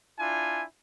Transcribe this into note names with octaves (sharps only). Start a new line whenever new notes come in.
D4 E4 F4 G#5